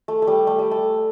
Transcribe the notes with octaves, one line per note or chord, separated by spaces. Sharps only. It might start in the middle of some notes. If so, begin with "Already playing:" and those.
A3
A3
G3
A3
G3
A3